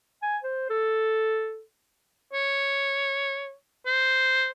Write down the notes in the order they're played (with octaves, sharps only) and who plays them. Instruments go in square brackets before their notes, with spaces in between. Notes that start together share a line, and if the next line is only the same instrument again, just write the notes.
[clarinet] G#5
C5
A4
[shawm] C#5
C5